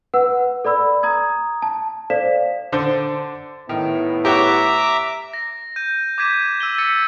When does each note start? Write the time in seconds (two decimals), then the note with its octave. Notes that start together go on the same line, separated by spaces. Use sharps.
0.14 B4 F#5 E6
0.65 A4 D5 B5 E6
1.03 A#5 D#6 G#6
1.62 A5
2.10 A4 C5 D5 F5 B6 E7
2.72 D3 D4 C5
3.69 A2 D#3 B3 E4
4.25 G4 C#5 E5 F#5 A#5 D6
5.34 A#6
5.76 G6 D#7
6.18 D6 G6 G#6 B6 D#7 E7
6.60 E6 D#7 G7
6.78 E6 A6 B6 C#7 D#7